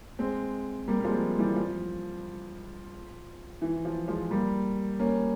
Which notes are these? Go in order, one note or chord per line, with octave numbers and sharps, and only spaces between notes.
G#3 C4
G3 A#3
G3
F3 G#3
E3 G3
F3
E3
F3
F3 G#3
G3 A#3
A#3 C#4